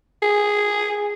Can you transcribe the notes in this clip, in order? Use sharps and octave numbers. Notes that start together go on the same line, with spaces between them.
G#4